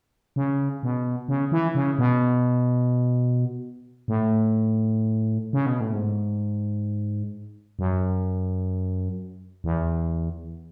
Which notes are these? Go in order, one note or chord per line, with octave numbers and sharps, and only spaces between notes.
C#3
B2
C#3
E3
C#3
B2
A2
C#3
B2
A2
G#2
F#2
E2